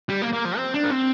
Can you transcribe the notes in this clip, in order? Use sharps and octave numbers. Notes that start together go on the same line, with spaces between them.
G3
A#3
A#3
F3
C4
D4
A#3
C4